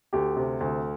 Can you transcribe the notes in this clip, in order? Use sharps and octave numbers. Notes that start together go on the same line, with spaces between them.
D2 G4
C3
D2